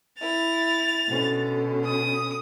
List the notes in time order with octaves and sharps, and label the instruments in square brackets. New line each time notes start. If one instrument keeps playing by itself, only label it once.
[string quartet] E4 [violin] A6 F7
[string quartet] B2 D3 C#4
[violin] D#6